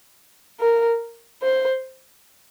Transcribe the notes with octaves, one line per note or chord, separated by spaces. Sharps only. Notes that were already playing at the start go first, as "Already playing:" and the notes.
A#4
C5